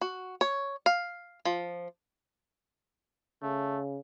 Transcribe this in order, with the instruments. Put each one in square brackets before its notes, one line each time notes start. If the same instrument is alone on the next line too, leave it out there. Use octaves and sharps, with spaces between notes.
[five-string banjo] F#4
C#5
F5
F3
[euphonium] C#3 [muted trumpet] A3